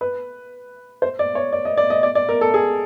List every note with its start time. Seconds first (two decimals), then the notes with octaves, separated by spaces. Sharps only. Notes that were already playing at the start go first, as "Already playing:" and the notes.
0.01 B4
1.02 C5
1.19 D5
1.35 C#5
1.52 D5
1.65 D#5
1.77 D5
1.90 D#5
2.03 D5
2.15 D5
2.29 A#4
2.41 A4
2.54 G#4